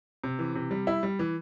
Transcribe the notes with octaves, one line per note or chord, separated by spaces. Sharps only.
C3
E3
C3
G3
E4
G3
E3